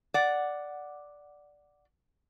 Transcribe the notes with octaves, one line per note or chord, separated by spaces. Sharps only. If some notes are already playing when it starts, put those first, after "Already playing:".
D5 F#5